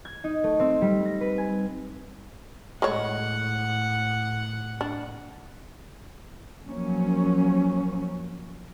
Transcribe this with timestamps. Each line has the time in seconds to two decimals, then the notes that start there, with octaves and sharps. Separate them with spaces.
0.05 G#6
0.24 D#4
0.44 A3
0.59 C4
0.82 G3
1.05 A#6
1.21 B4
1.38 G#5
2.82 A2 G#3 A3 C#5 F#5
4.81 D4
6.65 F3 F#3 A#3 C#4